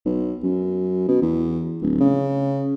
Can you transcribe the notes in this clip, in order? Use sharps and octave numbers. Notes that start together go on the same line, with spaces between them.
B1
F#2
B2
E2
D1
C#3